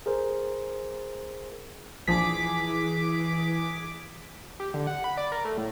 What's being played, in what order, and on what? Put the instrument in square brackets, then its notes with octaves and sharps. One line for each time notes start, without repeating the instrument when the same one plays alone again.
[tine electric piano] G#4 A#4 C5
[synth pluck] A#1 F3 D4 [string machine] E3 [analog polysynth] G#4 D6 [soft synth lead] B6
[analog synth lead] G4
D3
F#5
B5
D5
A#4
A3
A2